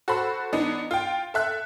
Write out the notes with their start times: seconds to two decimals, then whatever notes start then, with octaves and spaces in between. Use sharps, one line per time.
0.08 F#4 A4 C5 B5
0.53 E3 B3 D4 D#4
0.91 F4 G5
1.34 A4 E5 F#6